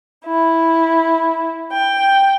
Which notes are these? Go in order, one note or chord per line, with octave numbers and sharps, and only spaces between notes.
E4
G5